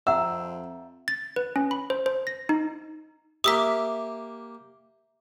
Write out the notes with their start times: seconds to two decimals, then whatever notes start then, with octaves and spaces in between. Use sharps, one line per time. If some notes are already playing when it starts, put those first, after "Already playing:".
0.07 F2 E5 F#5 A#5 E6
1.08 A6
1.36 B4
1.56 C#4
1.71 B5
1.90 C5
2.06 C5
2.27 A#6
2.49 D#4
3.44 A#3 G4 E5 D#6 E6 B6